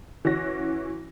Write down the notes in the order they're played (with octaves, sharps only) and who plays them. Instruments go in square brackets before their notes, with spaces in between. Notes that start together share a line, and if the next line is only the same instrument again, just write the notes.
[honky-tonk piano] E3 C#4 F#4 A#6